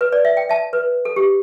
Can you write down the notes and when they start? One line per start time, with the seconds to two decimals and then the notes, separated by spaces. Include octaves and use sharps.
0.01 B4
0.12 D5
0.25 E5
0.37 G5
0.49 E5 A5
0.73 B4
1.05 A4
1.16 G4